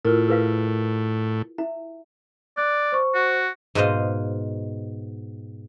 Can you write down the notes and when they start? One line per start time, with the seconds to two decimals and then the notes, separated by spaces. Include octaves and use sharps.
0.05 A2 E4 F4 A#4
0.28 E4 G#4 A#4 B4 F5
1.58 E4 E5
2.57 D5 F#6
2.92 C5 C#6
3.15 F#4
3.75 G#2 B2 B4 C5 D#5 F5